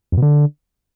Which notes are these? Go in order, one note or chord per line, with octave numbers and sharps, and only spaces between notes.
F2
B2
D3